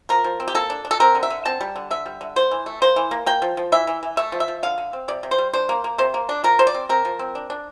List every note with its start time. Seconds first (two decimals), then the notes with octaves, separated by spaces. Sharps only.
0.09 F3 A#4
0.24 F3
0.40 C4
0.48 G4
0.54 A#3 A4
0.70 D4
0.85 D4
0.91 A4
1.00 C4 A#4
1.15 D3
1.23 E5
1.30 D3
1.45 C4 A5
1.61 G3
1.76 D3
1.91 D3 E5
2.06 G3
2.21 D3
2.36 A3 C5
2.51 E3
2.66 A3
2.82 A#3 C5
2.96 E3
3.11 A#3
3.26 A#3 G5
3.42 F3
3.57 F3
3.72 E3 E5
3.87 E3
4.03 E3
4.17 A3 E5
4.32 F3
4.40 E5
4.48 F3
4.63 D3 F5
4.78 D3
4.93 C4
5.08 C3 D5
5.23 C3
5.31 C5
5.38 G3
5.53 D4 C5
5.69 A#3
5.84 A#3
5.98 C3 C5
6.14 A#3
6.29 D4
6.44 F3 A#4
6.59 F3 C5
6.67 D5
6.74 C4
6.89 C4 A#4
7.05 F3
7.19 C4
7.35 D4
7.50 D4